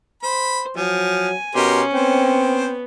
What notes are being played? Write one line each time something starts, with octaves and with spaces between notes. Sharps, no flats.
C5 B5
F3 F#3 G#5
B2 C#4 G4 A#4 C6
B3 C4 C5 G5